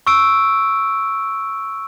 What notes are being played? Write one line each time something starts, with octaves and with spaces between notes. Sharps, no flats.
C#6 E6 D7